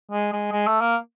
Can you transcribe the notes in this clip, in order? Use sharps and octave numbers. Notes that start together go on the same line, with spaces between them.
G#3
G#3
G#3
A3
A#3